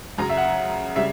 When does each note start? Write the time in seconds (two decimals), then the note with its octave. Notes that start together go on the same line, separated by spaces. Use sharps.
0.18 F#2 C#3 F#3 A#5
0.29 E5
0.37 F#5
0.96 C#3 G3 E5